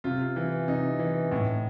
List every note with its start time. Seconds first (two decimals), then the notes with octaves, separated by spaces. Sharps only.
0.04 C3 F4
0.36 E3
0.68 C3 D#4
0.99 E3
1.32 A2